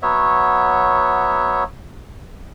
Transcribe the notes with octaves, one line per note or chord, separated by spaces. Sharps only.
F#3 B3 C#5 E5